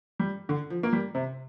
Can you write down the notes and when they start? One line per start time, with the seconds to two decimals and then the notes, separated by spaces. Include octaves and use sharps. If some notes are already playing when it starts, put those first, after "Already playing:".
0.19 G3
0.49 D3
0.70 F3
0.83 A#3
0.93 G3
1.15 C3